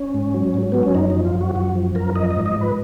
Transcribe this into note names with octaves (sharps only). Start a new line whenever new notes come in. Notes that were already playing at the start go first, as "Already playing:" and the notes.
Already playing: C#4
G#2
F#3
G#2
F#3 B3
C#4
F#2 D#4
F3 D#4
F4
F#2
F#4
F#2 F#4
F3
F#2 A#4
F3 D#5
D#5
G#2
D#5
G#2
B4